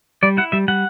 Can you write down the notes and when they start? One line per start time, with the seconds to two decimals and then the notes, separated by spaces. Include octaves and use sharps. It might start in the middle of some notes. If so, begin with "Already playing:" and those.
0.23 G3 D5
0.37 E4 F#5
0.52 G3 E5
0.68 G3 F#5